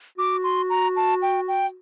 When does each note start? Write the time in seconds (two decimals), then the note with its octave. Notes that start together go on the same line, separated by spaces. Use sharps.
0.18 F#4 D6
0.44 C6
0.70 A#5
0.96 A5
1.22 G5
1.48 G5